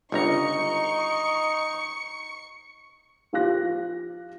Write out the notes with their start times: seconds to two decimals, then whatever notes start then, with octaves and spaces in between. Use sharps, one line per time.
0.12 G1 C#2 D#4 A#5 C#6 C#7
3.33 F3 F4 G4 F#6 A#6